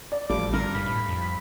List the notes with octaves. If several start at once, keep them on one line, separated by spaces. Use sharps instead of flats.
D5
A1 F3 G3 A3 D6
G2 D3 A#4
G#2 B5
A2
F2